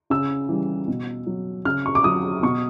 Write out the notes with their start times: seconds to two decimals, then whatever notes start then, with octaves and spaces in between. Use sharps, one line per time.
0.10 C#3 E6
0.49 E3 G3
0.88 B2
1.27 F#3
1.65 C#3 F6
1.86 C#6
1.95 D6
2.04 F#3 D#6
2.43 B2 C#6